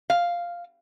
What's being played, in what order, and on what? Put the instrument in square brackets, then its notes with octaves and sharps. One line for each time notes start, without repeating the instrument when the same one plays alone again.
[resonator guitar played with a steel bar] F5